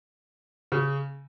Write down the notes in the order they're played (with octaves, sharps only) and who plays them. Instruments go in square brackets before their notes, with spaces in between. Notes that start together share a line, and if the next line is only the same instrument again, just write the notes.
[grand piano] C#3